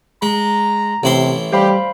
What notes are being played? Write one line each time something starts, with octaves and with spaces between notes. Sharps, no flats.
G#3 A#5
A1 C3 E4 C6
G3 G4 C5 F5 B5